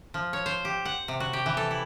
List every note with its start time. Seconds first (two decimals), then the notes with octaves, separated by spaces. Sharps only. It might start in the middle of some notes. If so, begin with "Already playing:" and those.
0.14 F3
0.33 C#5
0.46 C5
0.65 G4
0.85 F#5
1.08 C3
1.20 F#4
1.33 G4
1.46 E3
1.57 A4
1.71 E4